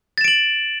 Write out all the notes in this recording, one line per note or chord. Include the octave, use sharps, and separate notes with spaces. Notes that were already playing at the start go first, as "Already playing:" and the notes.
A6 D7 E7 F#7